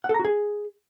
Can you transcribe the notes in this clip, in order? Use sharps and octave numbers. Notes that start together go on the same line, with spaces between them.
F#5
A4
A#5
F#4
G#4